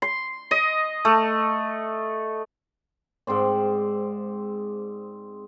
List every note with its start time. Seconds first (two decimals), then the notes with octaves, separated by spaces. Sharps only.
0.02 C6
0.51 D#5
1.05 A3
3.27 G#2 C4 C5 D5